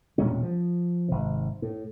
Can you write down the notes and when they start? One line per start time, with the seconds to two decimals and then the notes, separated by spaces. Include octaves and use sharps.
0.18 E1 A#2 G3 C#4
0.43 F3
1.08 G#1 C3
1.62 A2